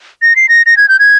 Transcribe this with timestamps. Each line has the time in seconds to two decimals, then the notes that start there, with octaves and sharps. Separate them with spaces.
0.22 A#6
0.36 C7
0.49 A#6
0.66 A#6
0.77 G#6
0.89 G6
0.99 G#6